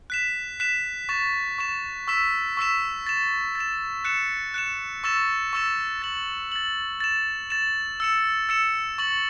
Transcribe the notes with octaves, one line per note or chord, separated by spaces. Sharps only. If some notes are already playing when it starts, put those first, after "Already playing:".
F#6 B6 E7
F#6 B6 E7
C#6 A6 E7
C#6 A6 E7
C#6 E6 B6 E7
C#6 E6 B6 E7
A6 E7
A6
E7
F#6 C#7 E7
F#6 C#7 E7
C#6 E6 A6 E7
C#6 E6 A6 E7
A6 F#7
A6 F#7
A6 E7
A6 E7
E6 C#7 E7
E6 C#7 E7
C#6 A6 F#7